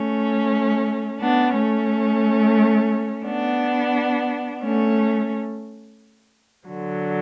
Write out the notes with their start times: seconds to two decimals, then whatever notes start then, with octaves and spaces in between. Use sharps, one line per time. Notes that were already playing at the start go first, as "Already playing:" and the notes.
Already playing: A3 C#4
1.20 B3 D4
1.54 A3 C#4
3.26 B3 D4
4.62 A3 C#4
6.67 D3 F#3